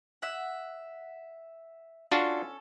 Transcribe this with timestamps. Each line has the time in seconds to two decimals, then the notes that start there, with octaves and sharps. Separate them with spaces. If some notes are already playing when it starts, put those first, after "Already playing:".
0.22 E5 F#5
2.12 C#4 D4 F4 F#4 A4